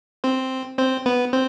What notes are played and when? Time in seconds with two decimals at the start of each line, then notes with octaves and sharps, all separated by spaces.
0.24 C4 C5
0.78 C4 C5
1.06 B3 B4
1.33 C4 C5